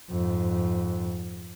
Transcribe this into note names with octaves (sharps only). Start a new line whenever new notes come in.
F2 G#2